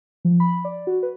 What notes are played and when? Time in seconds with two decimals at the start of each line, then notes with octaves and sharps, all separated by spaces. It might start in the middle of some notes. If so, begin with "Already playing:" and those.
0.25 F3
0.40 B5
0.65 D5
0.87 F#4
1.03 B4